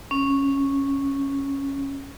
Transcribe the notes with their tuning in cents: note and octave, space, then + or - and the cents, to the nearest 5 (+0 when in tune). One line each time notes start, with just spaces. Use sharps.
C#4 -5